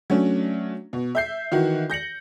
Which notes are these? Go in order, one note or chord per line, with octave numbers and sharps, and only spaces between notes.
F#3 A3 C#4 D4
B2
E5 G6 C7
D#3 E3 F#4
G6 A#6 C#7 F#7